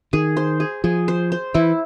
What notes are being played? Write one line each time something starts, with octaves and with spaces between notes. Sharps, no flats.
D#3 G#4
C5
G#4
F3 G#4
C5
C5
E3 E4